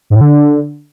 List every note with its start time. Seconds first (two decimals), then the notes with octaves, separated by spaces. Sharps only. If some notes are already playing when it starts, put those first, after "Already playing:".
0.10 G#2
0.16 A2
0.21 D3